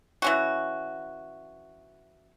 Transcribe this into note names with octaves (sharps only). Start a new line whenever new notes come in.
E3 C#4 F#4